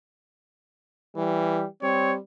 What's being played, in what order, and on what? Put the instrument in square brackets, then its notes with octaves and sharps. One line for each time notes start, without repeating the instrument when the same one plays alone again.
[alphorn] E3 [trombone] G3
[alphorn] G3 [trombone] C4 [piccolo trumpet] C#5